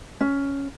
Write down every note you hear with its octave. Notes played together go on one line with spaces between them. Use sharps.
C#4